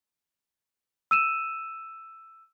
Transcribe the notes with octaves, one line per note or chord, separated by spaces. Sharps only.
E6 D#7 E7